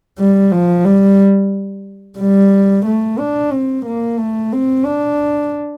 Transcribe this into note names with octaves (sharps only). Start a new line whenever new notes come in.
G3
F3
G3
G3
A3
D4
C4
A#3
A3
C4
D4